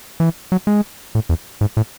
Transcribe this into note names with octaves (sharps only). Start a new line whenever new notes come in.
E3
F#3
G#3
A2
E2
G#2
A2